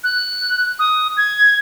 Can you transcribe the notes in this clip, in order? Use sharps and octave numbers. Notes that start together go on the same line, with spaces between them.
F#6
D#6
G#6